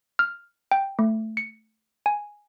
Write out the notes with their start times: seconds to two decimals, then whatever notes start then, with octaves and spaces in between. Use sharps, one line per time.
0.19 F6
0.71 G5
0.99 A3
1.37 C#7
2.06 G#5